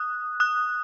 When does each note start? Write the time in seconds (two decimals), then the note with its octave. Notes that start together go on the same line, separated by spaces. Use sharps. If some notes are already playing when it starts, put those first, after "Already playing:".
Already playing: D#6 F#6
0.40 D#6 F#6